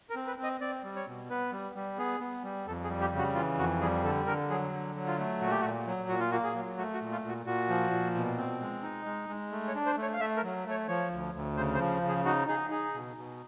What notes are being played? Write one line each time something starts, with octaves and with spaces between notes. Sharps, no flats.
A#4
C4
B4
C4
D#5
C4 D5
G3
C#5
B2
B3 B4
G3
G3
B3 G#4
B3
G3
F2 A4
G#4
G3
G4
C#3
F#4
E3 F4
F2 F#4
G3 G#4
D3 A4
D3 A#4
F#3 G#4
D3
F#3
F4
A3
A#2 F#4
G4
F#4
A#2
F#3
A#2 F#4
F4
A#3 F#4
G#4
F#3
A3 F#4
F#4
A#2
F4
A#2
F#4
A#2 F#4
F3
A#2
B2
C4
G#3
D#4
G#3
G#3
A3
C#5
D4
C5
A3
C#5
F5
A3 E5
A#4
F#3
A3 C#5
F3 C#5
D2
D2
C#3 C5
C5
F3
C#3
G#4
D#4 F#4
D#4 G#4
D#4 G#4
B2
B2